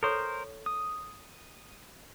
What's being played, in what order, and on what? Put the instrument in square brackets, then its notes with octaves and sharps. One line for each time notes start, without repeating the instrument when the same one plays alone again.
[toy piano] A4 C#5 C#6 [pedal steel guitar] A#4 C5
[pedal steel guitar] D#6